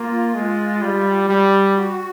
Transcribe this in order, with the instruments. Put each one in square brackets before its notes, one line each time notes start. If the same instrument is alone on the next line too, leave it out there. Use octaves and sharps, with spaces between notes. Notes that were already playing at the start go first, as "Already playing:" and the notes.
Already playing: [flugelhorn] A#3 [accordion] F4
[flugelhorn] G#3
G3
G3
[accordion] F#4